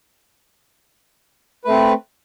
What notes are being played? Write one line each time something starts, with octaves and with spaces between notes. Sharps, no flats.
A3 C4 B4